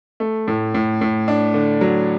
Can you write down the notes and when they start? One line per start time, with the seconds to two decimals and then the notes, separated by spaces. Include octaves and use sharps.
0.20 A3
0.48 A2
0.74 A2
1.01 A2
1.28 D4
1.54 D3
1.81 F#3